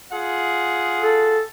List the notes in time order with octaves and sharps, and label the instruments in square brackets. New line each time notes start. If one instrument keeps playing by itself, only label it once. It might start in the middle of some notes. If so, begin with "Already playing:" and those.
[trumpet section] F4 G#4 F#5
[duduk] A4